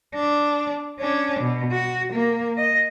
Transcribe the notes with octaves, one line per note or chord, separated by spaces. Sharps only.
D4
C#4 D4
B2
F#4
A#3
D#5